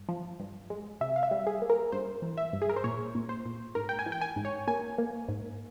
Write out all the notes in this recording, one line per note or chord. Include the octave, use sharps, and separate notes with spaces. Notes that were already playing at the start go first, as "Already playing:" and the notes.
Already playing: G2
F3
G2
G#3
C3 E5
F5
E5
G3
G#4
A#3
A#4
G2 C5
E3
E5
G2
G#4
A#4
C5
A#2 C#5
A#2
C5
A#2
G#2 A#4
G5
G#5
E3
G5
G#5
G#2
C#5
A#3 G#5
A#3
G#2